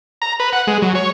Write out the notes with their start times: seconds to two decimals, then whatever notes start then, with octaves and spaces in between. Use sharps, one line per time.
0.22 A#5
0.40 B4
0.53 F#5
0.67 G#3
0.82 F#3
0.95 C#5